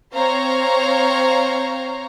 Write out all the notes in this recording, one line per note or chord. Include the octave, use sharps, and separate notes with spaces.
C4 C5 C#5 F5 A#5